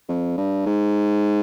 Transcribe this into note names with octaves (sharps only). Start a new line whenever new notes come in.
F2
G2
G#2